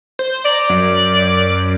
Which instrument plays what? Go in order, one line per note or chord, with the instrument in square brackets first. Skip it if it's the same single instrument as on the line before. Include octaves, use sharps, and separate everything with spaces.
[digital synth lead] C5
[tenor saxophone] D5 [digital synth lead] A#5
[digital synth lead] F#2